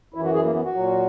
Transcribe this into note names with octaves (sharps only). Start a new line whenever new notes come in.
F#2 E3 E4
F#4
G#4
A#3
B3
F#4
A#2 F#3